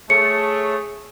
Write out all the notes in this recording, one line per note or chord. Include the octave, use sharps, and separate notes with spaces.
A3 G#4 C#5 C#7